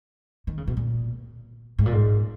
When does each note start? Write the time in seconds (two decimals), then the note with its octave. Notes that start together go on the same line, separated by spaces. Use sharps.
0.47 D#3
0.58 C#3
0.68 B2
0.77 A#2
1.79 G#2
1.86 A#2
1.93 G#2